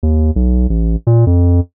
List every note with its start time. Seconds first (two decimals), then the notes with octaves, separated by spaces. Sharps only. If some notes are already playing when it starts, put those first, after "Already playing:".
0.03 D#2
0.36 B1
0.70 A1
1.07 A#2
1.27 F2